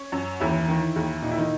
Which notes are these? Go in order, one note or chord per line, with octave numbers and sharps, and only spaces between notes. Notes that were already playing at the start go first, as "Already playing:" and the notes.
Already playing: C#4 C#5
F#2
D#2 E3 E4
D#3
D#2
A#2 D#4
E4
D#3 D#4